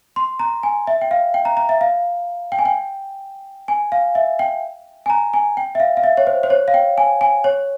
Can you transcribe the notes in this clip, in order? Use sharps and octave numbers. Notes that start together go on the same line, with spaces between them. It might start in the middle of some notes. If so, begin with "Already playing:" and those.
C6
A#5
G#5
E5
G5
F5
G5
A#5
A#5
E5
F5
G5
G#5
G5
G#5
F5
E5
G5
G#5
A#5
G#5
G5
E5
F5
F5
E5
C#5
C5
C5
C#5
F5
G5
G#5
G#5
C#5